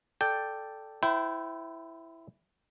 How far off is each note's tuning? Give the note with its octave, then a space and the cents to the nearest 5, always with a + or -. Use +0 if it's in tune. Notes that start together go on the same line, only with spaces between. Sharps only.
A4 +0 D5 +0 G5 +0
E4 +0 C5 -40 G5 -20